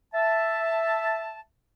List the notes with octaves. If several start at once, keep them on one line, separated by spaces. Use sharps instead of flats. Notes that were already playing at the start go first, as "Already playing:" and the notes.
E5 A5